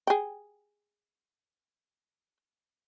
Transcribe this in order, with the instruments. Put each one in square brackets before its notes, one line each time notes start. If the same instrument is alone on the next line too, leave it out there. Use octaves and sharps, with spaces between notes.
[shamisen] G#4 G5